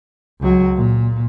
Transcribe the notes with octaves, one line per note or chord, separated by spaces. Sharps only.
C#2 F#3
A#2